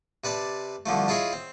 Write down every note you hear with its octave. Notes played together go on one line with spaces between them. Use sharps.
C3 B4 D5 A5
C2 D3 F3 A3
E4 F4 G#4 C#5 D#5 E5
C4